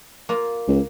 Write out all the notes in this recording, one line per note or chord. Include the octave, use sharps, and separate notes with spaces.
A#3 F4
C#2